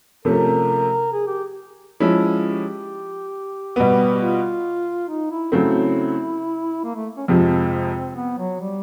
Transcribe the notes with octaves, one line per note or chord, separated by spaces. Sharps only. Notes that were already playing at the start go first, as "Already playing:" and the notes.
C3 F3 A3 C#4 A#4
G#4
G4
F3 G#3 C#4 E4
G4
B2 G3 B3
F4
D#4
E4
C#3 F#3 A3 C4 E4
A#3
A3
C#4
F2 C3 F3 G#3 C4
B3
F#3
G3